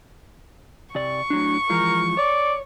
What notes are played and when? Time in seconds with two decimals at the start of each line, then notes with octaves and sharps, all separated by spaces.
0.95 C3 D5 C#6
1.30 A2 F#3 D4
1.70 E3 F3 G#3 A#4
2.17 C#5 D5